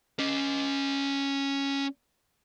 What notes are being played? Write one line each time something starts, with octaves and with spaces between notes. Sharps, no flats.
C#4 D#5